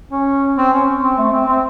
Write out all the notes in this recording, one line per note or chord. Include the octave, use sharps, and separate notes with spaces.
C#4
C4
C#4
C4
A3
C4
C4